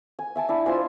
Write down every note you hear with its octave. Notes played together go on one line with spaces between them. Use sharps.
G#5
E5 G#5 A5
D4 E4
F4 C5 D#5 G#5